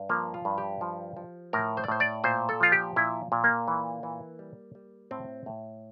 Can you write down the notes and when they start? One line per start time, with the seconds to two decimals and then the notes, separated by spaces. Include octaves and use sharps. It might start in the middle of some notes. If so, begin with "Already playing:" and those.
Already playing: G2
0.09 F3 A#3
0.34 F4
0.45 G2
0.58 G4
0.81 F3
1.17 F3
1.53 A2 A#4
1.77 C5
1.84 D5
1.88 A2 C5
2.00 D5
2.24 A#2 C5
2.49 A4
2.60 F3 F4
2.72 G4
2.96 A#2 E4
3.32 A#2
3.44 A#3
3.68 E3
4.03 E3
4.39 G3
4.75 G3
5.11 A2 C4
5.46 A2